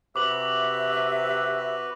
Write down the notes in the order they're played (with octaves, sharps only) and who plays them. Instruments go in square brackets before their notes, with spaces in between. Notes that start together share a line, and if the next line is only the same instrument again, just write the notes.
[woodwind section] C3 E5 [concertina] F#4 B4 [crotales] D6 F#7